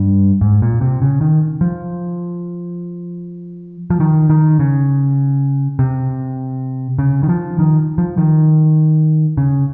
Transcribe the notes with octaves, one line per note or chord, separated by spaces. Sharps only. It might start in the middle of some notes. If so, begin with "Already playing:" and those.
Already playing: G2
G#2
A#2
C3
C#3
D#3
F3
F3
D#3
D#3
C#3
C3
C#3
D#3
F3
D#3
F3
D#3
C#3